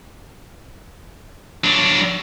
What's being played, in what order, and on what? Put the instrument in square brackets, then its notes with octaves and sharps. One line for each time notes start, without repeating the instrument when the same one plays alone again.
[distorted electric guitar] F#3 D4